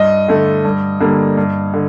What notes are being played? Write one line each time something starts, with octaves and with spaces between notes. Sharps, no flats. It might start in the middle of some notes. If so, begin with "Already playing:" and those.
Already playing: G2 D#5
D3 A3
G2
D3 G3 A#3
G2
D3